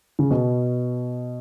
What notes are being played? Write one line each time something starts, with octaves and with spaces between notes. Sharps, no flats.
C#3
B2